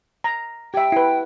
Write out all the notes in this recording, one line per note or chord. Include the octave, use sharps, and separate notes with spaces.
A#5
G4 E5 G5
E4 B4